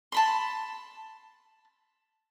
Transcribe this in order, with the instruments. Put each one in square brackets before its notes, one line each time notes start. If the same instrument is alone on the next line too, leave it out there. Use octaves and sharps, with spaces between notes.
[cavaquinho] A5 B5 C6